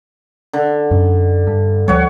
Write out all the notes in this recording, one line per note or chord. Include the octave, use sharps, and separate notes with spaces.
D3
F#2
G2
D2 F3 G3 C#5 F#5